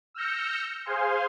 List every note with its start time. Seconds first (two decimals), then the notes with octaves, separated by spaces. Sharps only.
0.14 E6 F6 G6 A#6 C#7
0.86 G#4 C5 F5 G#5 C6